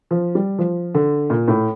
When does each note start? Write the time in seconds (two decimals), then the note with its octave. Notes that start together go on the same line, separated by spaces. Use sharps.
0.11 F3
0.35 G3
0.58 F3
0.95 D3
1.30 A#2
1.48 A2